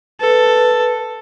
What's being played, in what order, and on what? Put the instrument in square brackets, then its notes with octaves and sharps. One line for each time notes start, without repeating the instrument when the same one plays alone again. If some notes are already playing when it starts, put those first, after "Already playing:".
[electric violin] A4 [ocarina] B4